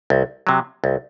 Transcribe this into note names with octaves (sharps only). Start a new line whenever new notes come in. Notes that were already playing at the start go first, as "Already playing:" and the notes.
C2
C3 F#3
C2